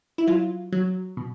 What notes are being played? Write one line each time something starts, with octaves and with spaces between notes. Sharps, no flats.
E4
F#3 F4
F#3
B2